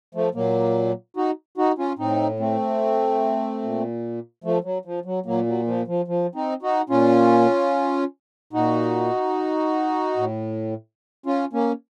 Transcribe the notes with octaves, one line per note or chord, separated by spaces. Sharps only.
F3 A3
A#2 F#3 A#3
D#4 F#4
D#4 F#4
C#4 F4
A2 C4 D#4
A3 C4
A#2
F3 A3
F#3
F3
F#3
A#2 F#3 A#3
F#3
F3
F3
F3
C4 D#4
D#4 F#4
A#2 C#4 F4
A#2 D#4 F#4
A2
C#4 F4
A#3 C#4